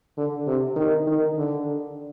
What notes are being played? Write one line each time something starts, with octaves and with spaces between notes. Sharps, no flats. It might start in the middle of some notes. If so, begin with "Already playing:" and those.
D3
C3
D#3
D#3
D3